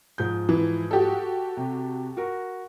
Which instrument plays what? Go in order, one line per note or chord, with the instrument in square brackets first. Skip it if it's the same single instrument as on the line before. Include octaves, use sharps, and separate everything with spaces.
[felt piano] G#2 F3 G6
[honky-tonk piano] E3
F#4 G4 A4
[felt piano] C3
F#4 A#4